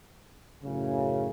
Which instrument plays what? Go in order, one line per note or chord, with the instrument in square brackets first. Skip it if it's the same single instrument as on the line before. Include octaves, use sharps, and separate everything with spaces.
[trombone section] F#2 A2 C#3